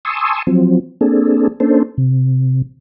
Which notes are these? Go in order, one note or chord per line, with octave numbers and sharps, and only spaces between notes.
G#5 A5 C6 C#6 D#6 E6
F3 F#3 C4
A#3 C4 D4 G#4 A4
A#3 C#4 D4 A4 C5
C3